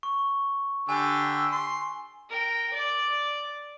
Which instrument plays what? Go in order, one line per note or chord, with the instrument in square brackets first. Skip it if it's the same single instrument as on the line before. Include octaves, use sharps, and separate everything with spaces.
[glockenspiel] C#6
[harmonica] D3 G4 E6 [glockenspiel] G#5
[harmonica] C6
[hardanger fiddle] A#4 G5
D5